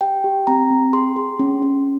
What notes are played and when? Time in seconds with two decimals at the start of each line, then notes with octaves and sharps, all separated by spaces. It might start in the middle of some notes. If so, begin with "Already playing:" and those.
0.01 G4 G5
0.24 G4
0.47 C4 A#5
0.70 C4
0.93 G#4 C6
1.16 G#4
1.39 C#4
1.62 C#4